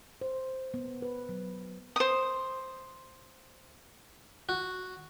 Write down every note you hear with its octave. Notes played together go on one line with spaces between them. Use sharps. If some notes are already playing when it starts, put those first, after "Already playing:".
C5
B3
B4
F#3
C5 D#6
F#4